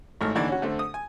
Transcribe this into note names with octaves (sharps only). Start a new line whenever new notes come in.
G#1 A2 A4 F6
D#2 D3 E3 D5
C#4 F#4
D3 A3 C4
D#6
G#5